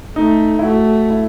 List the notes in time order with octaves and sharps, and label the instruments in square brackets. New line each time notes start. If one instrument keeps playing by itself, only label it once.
[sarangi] A3 [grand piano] D#4
[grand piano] E4
[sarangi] A3 [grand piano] F#4
[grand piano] E4